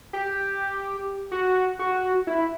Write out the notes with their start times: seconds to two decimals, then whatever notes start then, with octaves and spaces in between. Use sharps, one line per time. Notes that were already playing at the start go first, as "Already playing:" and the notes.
0.13 G4
1.32 F#4
1.79 F#4
2.27 E4